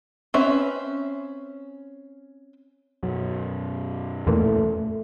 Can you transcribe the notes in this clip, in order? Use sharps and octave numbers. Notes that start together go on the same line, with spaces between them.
C4 C#4 B4 E5
F#2 B2 F#3
E2 A#2 E3 A3